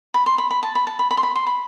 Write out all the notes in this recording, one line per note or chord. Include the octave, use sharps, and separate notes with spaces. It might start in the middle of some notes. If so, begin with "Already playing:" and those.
B5
C6
B5
B5
A5
B5
A5
B5
B5
C6
B5
C6
B5